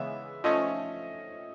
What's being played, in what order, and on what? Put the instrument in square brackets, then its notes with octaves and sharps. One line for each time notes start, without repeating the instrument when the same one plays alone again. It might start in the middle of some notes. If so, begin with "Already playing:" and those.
Already playing: [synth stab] C#3 E3 G#3 B3 [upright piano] E5
[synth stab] F3 A3 C#4 [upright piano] D#5